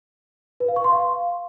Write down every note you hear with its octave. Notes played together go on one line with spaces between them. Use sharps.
B4
F5
C#6
C6
F5